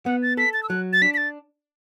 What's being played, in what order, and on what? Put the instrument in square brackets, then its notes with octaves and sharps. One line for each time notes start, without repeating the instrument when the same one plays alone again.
[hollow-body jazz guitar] B3 [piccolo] F#5
[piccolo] A6
[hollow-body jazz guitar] A4 [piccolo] B6
[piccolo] A6
E6
[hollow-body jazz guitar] F#3 [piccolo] F#6
[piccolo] A6
[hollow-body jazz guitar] D4 [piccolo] B6
[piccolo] B6
A6